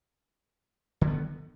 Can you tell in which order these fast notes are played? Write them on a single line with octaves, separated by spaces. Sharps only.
D3 F3 B3 D#3